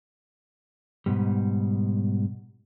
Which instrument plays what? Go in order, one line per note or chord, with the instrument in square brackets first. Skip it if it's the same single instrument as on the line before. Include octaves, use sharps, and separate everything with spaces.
[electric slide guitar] G#2 B2 G3